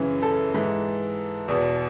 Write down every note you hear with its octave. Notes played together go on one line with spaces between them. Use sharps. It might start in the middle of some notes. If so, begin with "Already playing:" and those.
Already playing: F#2 C#3 E3
A4
G#2 E3
E2 B2